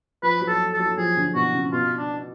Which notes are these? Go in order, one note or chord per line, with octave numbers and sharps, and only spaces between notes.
F3 B4
F#3
A4
A4
F#3
F3 G#4
D3
B2 F#4
C#3
B2 F4
D4